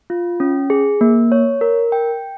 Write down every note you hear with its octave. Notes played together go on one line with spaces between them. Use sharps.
F4
C#4
G#4
A#3
C#5
A#4
G5